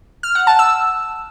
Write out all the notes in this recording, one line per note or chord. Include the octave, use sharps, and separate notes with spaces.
F6
F#5
A5
E6